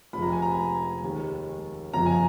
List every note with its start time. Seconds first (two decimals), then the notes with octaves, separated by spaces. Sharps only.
0.13 F1 F2 F3 G#3 B5
0.22 A#5
0.32 G#5
0.42 A#5
1.03 D#2 D#3 G#3
1.94 F#1 F2 C#3 F3 G#3 A#5
2.06 G#5